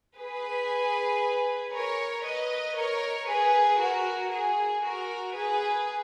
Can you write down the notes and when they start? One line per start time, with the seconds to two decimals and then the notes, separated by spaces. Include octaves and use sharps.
0.19 G#4 B4
1.74 A#4 C#5
2.26 B4 D#5
2.76 A#4 C#5
3.28 G#4 B4
3.80 F#4 A#4
4.31 G#4
4.83 F#4 A#4
5.35 G#4 B4